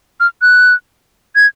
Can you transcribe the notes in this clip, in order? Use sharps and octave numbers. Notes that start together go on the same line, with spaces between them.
F6
F#6
G#6